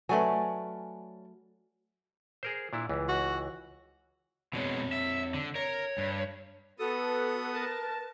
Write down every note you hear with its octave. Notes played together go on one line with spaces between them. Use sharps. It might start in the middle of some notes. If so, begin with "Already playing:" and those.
F#3 A3 C#4 B4 D5 G#5
G#4 A#4 C5
A#2 D4 E4
C#2 E3
F#4
F2 B2 G#3 C4 C#5
E5
D3
A#4 C#5
G2
B3 F#4 A4 B4 D#6
A#4 A5